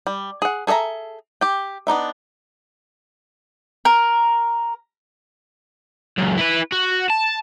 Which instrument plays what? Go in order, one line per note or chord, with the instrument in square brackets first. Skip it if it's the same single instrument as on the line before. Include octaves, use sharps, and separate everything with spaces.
[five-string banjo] G3
G#4 F#5
G#4 A4 D5 E5 A#5
G4 G5
B3 D4 D#4 E5
[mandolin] A#4
[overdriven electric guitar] C#2 F#2
E4 B4
F#4
A5